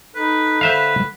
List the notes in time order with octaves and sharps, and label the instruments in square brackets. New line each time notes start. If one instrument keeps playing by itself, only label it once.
[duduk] D#4 [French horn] A4 [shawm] B4
[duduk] D3 [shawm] B4 [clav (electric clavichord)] C5 E5 F5